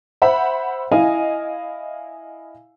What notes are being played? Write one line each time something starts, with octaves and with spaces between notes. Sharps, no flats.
C5 E5 F#5 B5
E4 D#5 F5 G#5